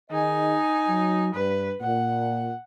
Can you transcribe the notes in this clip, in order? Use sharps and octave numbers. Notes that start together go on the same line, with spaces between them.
D#3 D#4 G#4 D#5 G#5
F#3
G2 B4
A#2 F#5